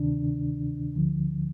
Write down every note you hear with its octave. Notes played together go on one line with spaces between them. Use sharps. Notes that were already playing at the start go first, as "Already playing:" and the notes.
Already playing: D2 C3 D#3 D4
D2 D3 F3